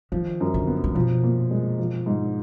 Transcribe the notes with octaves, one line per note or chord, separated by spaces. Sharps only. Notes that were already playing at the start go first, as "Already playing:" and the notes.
D#3 F3
F#2
D3
B3
D3
B2 F3
A#2
G#3
F3
G#2